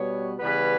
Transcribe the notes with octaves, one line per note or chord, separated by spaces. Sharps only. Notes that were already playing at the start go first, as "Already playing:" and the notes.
Already playing: B2 G3 B3 C#5
C#3 E3 G3 B3 B4